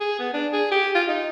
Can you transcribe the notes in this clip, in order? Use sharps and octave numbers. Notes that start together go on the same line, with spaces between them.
G#4
B3
D4
G#4
G4
F4
D#4